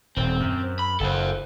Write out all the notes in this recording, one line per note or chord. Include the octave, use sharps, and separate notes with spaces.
D#1 C4
F#2
B5
F#1 A4 C5